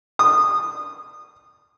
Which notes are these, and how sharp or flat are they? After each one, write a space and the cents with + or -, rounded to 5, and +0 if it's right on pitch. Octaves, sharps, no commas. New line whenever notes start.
D#6 -20